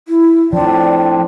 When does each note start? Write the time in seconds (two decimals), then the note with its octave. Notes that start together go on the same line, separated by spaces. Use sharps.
0.08 E4
0.53 A2 F3 C4 D4 D5